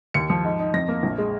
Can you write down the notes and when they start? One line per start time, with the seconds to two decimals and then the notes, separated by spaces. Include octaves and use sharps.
0.14 D#2 C#7
0.30 F3
0.45 G#2
0.60 D#4
0.74 F2 A#6
0.88 A#3
1.03 A#1
1.18 G#3